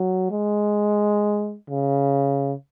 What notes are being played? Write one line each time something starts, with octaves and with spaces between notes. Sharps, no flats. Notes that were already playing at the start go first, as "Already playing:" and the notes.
Already playing: F#3
G#3
C#3